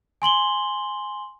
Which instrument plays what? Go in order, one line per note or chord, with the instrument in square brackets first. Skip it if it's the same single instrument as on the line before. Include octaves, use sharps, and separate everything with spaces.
[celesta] G#5 C6 F#7 G7